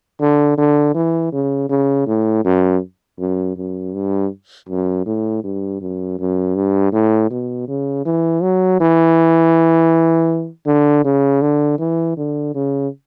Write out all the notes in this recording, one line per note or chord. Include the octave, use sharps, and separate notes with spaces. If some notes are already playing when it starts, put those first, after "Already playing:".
D3
D3
E3
C#3
C#3
A2
F#2
F#2
F#2
G2
F#2
A2
G2
F#2
F#2
G2
A2
B2
C#3
E3
F#3
E3
D3
C#3
D3
E3
D3
C#3